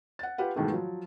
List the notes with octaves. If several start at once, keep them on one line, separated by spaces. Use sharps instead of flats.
F#5 A6
F4 G4 B4 F#5
G#2 B2 D#3 E3 G#3 A3
F3 F#3